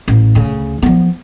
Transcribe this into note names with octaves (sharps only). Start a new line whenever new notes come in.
A1
D2 C#3
F3 B3